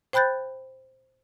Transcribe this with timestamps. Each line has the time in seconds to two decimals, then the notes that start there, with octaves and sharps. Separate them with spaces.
0.13 C5 G5 B5 F#6 G6 A6